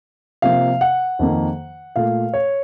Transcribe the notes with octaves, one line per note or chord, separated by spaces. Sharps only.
C3 F3 A#3 F5
F#5
F2 D#3 A#3
A#2 A3 F5
C#5